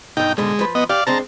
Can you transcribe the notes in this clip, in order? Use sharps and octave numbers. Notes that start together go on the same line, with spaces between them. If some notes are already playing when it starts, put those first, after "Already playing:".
B1 G2 D#4 G5
G#2 B2 D3 G#3
F3 B4
B3 D#5
G4 D5 F5
G#3 C4 D4 A5 A#5